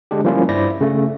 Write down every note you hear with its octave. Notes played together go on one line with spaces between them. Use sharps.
D3 G#3 D4 G4
F3 G3 A#3 C#4 E4 F4
G2 E4 C5 D5 A#6
C#3 A3